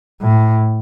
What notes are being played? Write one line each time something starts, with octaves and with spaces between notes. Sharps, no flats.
A2